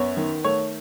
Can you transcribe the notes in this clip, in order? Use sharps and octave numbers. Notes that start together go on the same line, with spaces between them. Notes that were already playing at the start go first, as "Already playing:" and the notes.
Already playing: F#2 B3 C#5
D#3
A3 C#5